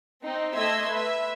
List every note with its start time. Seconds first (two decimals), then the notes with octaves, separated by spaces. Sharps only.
0.23 C4 D#4
0.53 A3 D#5 E5 C6 E6 G#6
0.89 B4 E5